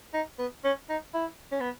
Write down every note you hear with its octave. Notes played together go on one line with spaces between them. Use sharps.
D#4
B3
C#4
D#4
E4
C#4
B3